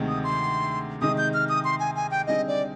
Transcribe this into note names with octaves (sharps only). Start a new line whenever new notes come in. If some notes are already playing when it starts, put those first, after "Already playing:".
Already playing: D2 C3 D#3 G#3 C4
D#6
C6
C3 D#3 G#3 D#4 D#6
G6
F6
D#6
C6
G#5
G#5
G5
D3 G3 C4 D#4 G#4 D#5
D5